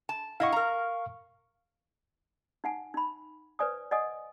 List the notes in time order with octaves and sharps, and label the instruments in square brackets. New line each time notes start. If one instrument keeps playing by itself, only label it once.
[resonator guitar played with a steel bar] A5
[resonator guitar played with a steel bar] E4 D#5 F#5 [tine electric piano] F5 C#6
[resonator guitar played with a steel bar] A#4 A#5
[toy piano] D#4 F#5 G#5
D#4 B5
B4 C5 D5 G#5 D#6
D5 D#5 F#5 G#5 D#6